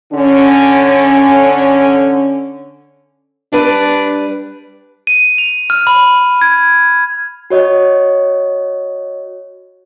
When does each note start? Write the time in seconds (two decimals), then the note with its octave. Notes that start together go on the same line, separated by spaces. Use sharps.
0.13 D3 C#4
3.52 G3 D4 B4
5.07 D#7
5.38 F7
5.70 F6
5.87 B5
6.41 G#6
7.50 F#4 C#5 D#5